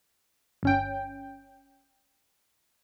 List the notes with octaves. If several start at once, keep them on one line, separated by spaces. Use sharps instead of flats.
G1 C#4 G5